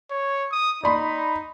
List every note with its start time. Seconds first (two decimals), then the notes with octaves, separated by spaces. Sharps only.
0.11 C#5
0.52 D#6
0.84 D#4 D5 B5 C6